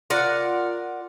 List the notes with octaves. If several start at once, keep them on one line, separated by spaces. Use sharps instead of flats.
F4 A#4 D5 F#5